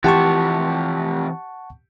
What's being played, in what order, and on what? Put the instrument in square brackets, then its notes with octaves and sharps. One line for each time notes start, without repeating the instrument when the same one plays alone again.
[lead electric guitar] C3 F3 [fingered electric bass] E3 [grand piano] G4 [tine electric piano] F#5 A5 C#6